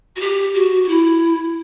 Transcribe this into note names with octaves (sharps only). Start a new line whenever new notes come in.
F#4
G4
F#4
F#4
E4